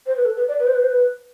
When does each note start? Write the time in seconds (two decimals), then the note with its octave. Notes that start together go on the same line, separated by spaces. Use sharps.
0.06 C5
0.16 B4
0.25 A4
0.37 B4
0.48 D5
0.59 B4
0.67 C5
0.75 B4
0.82 C5
0.90 B4